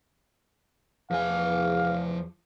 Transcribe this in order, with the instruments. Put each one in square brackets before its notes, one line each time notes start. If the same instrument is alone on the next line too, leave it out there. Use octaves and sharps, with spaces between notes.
[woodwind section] E2 [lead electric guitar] F3 G#5 [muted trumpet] F5